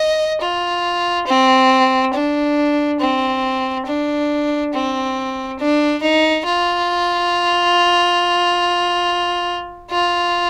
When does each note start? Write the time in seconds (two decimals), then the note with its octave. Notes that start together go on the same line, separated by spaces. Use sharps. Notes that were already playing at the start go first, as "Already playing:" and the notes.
Already playing: D#5
0.41 F4
1.27 C4
2.13 D4
3.00 C4
3.86 D4
4.73 C4
5.59 D4
6.02 D#4
6.45 F4
9.91 F4